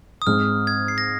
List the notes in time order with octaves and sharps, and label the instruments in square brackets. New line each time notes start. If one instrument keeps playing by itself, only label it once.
[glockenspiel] D#6
[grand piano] G#2 G#3 C4 [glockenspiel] F6
[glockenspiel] G#6
C7
A#6